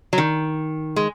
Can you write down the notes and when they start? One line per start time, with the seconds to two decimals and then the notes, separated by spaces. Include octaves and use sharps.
0.13 F#3
0.18 D#3
0.96 G#3